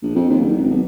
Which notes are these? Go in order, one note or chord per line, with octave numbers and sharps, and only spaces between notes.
A#1
F2
D#2
F#1
G#1
B1